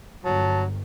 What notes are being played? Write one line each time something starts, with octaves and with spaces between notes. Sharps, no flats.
G1 F#3 A5